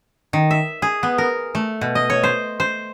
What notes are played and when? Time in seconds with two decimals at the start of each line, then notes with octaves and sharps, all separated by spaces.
0.33 D#3
0.51 E5
0.82 G#4
1.03 B3
1.18 A#4
1.55 A3
1.81 B2
1.95 D#5
2.10 C#5
2.23 C5
2.60 C5